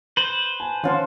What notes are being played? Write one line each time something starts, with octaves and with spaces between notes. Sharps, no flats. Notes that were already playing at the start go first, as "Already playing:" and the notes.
B4 C5
G#5 A5
D#3 F3 C#4 F4 C#5 F5 F#5 C6